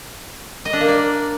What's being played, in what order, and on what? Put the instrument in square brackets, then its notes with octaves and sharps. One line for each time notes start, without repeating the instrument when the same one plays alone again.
[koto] D#5
D4
A#3
D5